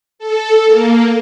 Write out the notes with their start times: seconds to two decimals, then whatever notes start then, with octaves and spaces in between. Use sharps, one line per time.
0.19 A4
0.66 A#3